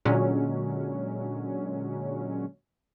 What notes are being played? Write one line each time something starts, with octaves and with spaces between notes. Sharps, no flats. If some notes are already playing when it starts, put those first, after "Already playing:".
A#2 D3 F#3 G#3 C#4